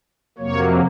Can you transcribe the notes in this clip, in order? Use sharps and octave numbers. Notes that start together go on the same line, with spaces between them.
F2 C3 F#3 A#3 C#5